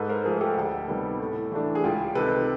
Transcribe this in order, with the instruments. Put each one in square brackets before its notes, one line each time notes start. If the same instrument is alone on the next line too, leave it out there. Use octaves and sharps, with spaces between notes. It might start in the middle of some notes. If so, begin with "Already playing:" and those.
Already playing: [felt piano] G#2 A4 B4
A#4 C5
F3 A3 G#4 A#4
G4 A4
D2
C3 D#3 G3 B3
A2
E3 A3 D4
G#4
C#2 F4 G4
C3 D#3 A4 B4